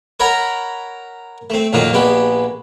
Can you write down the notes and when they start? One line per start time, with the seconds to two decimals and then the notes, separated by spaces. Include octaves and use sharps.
0.20 A#4 C#5 D#5 F#5 A#5 B5
1.50 A3 C4
1.73 F2 A#2 D#3 F3 F#3 F4
1.93 A#1 G#3 B3 G4 B4